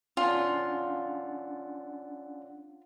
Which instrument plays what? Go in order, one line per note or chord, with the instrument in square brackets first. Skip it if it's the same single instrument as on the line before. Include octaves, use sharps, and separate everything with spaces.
[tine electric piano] C#4 D4 F#5 [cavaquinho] F4